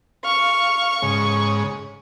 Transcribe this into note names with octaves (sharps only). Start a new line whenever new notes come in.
F5 C#6
G#2 C#3